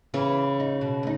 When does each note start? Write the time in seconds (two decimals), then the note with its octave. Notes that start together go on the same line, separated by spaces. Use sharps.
0.14 C#3 E3
0.60 D#4
0.81 B2
1.03 D2 D#4